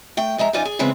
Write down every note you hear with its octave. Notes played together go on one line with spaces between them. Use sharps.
A3 G5
F3 G#3 E5 A#5
F#2 D#4 F4 D5 G#5
G#4
C#3 E3 G#3 B3 C4